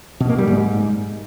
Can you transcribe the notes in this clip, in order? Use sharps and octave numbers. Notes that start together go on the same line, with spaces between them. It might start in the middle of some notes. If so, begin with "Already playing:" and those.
B2
A#3
G3
G#2